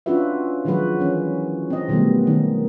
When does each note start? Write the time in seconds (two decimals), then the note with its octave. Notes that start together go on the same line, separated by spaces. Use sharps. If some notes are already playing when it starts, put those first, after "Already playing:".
0.06 C#4 D4 F4 F#4 B4 E5
0.65 D#3 F3 F#3 G#3 F#4 B4
1.00 E3 C#4
1.70 C4 D#5
1.88 B2 D#3 F#3 G3 A3 B3
2.27 D#3